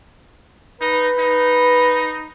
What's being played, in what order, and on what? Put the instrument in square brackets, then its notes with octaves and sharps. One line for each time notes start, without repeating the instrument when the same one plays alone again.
[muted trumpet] D#4 [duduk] B4
[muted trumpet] D#4